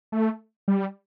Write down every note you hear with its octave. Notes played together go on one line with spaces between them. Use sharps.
A3
G3